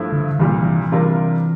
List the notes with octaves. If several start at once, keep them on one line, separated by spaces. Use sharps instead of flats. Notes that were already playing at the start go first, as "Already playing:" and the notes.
Already playing: G2 F3 A3 E4
D3
C2 A#2 E3 G3 D4
E3
C3 G3 D4 F4 A#4